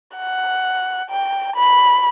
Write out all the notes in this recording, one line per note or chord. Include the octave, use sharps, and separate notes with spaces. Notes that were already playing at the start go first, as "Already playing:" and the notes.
F#5
G5
B5